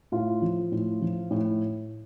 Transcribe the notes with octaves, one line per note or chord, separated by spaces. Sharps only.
A2 F4
F3
A2
F3
A2